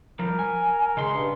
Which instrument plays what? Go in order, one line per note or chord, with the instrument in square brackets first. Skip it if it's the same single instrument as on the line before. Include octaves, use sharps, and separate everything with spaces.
[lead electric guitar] F3 G3 [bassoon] A#4
[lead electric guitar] G#5
[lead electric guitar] C#3 C6 [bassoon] G#3
[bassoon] G2